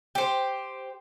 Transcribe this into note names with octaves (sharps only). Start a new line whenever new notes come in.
G4 C5